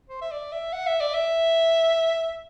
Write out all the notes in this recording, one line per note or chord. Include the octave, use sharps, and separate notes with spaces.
C5
E5
D5
E5
F#5
E5
D5
E5